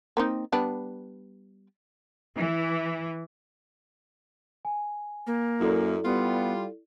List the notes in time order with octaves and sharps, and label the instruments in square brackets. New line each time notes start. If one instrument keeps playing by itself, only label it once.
[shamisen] A#3 C4 D#4
G3 B3 D4
[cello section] E3
[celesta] G#5
[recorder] A#3
[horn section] F#2 [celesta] E4 A4 D5
[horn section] G3 F4 [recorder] B3